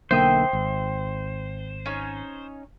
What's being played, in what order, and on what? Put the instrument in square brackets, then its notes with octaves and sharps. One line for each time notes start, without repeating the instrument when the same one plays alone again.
[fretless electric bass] B1 D3 A#3 [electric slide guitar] C5 [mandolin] E5 G5 D#6
[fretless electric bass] G#1
[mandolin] C#4 D#4 C#5